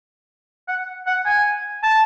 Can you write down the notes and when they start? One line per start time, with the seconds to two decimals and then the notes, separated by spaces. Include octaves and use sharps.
0.68 F#5
1.07 F#5
1.26 G#5
1.83 A5